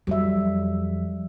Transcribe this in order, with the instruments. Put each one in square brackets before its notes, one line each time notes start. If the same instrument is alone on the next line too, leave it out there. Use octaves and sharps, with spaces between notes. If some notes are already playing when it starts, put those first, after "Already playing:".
[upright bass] F2 [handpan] F#3 G3 E5